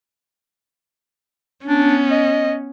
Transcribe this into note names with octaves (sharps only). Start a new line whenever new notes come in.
B3 C#4 D4
D#5